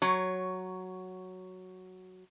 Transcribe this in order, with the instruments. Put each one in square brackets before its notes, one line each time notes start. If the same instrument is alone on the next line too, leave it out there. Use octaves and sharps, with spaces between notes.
[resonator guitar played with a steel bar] F#3 C#5